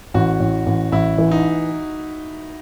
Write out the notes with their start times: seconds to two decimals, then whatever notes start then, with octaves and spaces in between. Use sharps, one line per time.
0.14 A1 F#4
0.40 A1
0.66 A1
0.92 A1 E4
1.18 E3
1.31 D#4